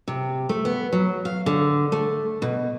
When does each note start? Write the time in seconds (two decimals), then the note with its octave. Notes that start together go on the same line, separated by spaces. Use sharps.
0.08 C3
0.49 A3
0.65 B3
0.93 F#3
1.25 F5
1.46 D3
1.92 A3
2.42 B2